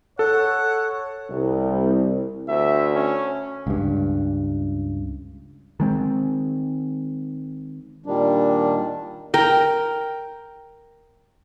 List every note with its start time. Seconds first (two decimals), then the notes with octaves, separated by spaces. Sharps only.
0.19 A4 C#5 F#5
1.30 C2
2.48 D2 E5
2.94 C#4
3.67 C#2 G2
5.80 D#3 G#3 C4
8.06 A#2 D#3 G3 D4
9.34 A#4 G5